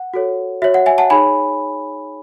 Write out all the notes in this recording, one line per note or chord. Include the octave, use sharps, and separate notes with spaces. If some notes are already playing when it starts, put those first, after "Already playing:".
Already playing: F#5
F#4 A4 C#5
F#4 C#5 E5
F#5
E5 G#5
F#5 A5
D#4 G#4 C#5 G#5 B5